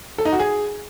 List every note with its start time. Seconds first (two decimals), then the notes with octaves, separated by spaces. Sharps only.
0.18 A4
0.25 D#4
0.32 F#4
0.39 G#4